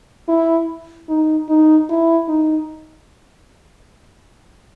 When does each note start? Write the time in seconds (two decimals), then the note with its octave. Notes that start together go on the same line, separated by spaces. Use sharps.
0.28 E4
1.09 D#4
1.49 D#4
1.89 E4
2.28 D#4